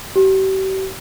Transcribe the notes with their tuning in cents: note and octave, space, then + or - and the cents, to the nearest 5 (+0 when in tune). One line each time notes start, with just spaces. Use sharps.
G4 -40